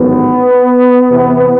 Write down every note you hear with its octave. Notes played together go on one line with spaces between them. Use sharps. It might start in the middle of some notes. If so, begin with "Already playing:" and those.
Already playing: A1 G#2 D#3 F#3 B3
E2 C3 E3